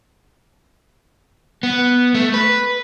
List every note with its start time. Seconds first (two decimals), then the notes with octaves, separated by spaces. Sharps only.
1.63 B3
2.14 A3
2.34 B4